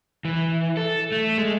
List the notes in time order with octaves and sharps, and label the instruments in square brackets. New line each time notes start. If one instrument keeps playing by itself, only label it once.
[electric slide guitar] E3
A4
A3
G#3